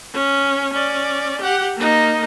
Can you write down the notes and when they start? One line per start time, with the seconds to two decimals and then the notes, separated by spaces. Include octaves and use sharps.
0.14 C#4
0.72 C#4 D5
1.41 G4 F#5
1.77 A#3 D#4